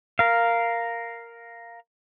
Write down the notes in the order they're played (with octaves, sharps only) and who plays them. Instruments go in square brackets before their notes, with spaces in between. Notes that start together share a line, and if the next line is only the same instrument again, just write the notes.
[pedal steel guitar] A#4 F5